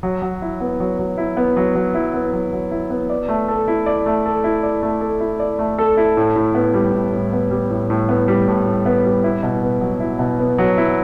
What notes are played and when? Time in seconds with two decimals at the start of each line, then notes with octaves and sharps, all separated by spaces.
0.03 F#3
0.22 F#3
0.42 E4
0.60 B3
0.80 F#3
0.99 F#3
1.18 E4
1.37 B3
1.57 F#3
1.75 F#3
1.94 E4
2.14 B3
2.33 F#3
2.53 F#3
2.71 E4
2.90 B3
3.10 D5
3.28 A3
3.48 A4
3.68 E4
3.86 D5
4.06 A3
4.26 A4
4.44 E4
4.63 D5
4.83 A3
5.01 A4
5.20 E4
5.40 D5
5.59 A3
5.79 A4
5.97 E4
6.17 A2
6.36 A2
6.55 B3
6.74 G3
6.93 A2
7.12 A2
7.33 B3
7.51 G3
7.71 A2
7.90 A2
8.09 B3
8.28 G3
8.48 A2
8.66 A2
8.86 B3
9.05 G3
9.24 E4
9.43 B2
9.62 B3
9.81 F#3
10.00 E4
10.19 B2
10.39 B3
10.58 F#3
10.78 E4